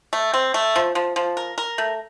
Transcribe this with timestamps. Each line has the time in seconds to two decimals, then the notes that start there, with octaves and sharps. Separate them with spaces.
0.13 A3
0.34 C4
0.54 A3
0.76 F3
0.95 F3
1.16 F3
1.37 A#4
1.58 A#4
1.78 A3